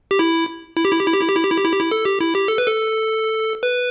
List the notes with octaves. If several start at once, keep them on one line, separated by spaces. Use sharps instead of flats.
G4
E4
E4
G4
E4
G4
E4
G4
E4
G4
E4
G4
E4
G4
E4
G4
E4
A4
G4
E4
G4
A4
B4
A4
B4